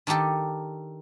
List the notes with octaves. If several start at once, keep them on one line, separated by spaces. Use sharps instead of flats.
D#3 D4 D#4 G4 A4